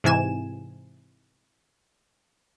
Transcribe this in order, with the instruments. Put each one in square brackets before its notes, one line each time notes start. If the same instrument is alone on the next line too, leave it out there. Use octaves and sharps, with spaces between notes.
[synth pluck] G#2 C3 E3 G#5 E7